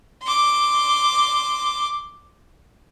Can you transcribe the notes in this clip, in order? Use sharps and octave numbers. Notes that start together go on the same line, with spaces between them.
C6 D6